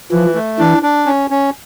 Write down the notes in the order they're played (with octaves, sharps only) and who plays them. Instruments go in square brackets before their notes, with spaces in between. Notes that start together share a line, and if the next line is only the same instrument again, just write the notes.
[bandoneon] E3 [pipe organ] F3
[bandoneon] A3
[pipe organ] E3 [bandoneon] D4
[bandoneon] D4
C#4
C#4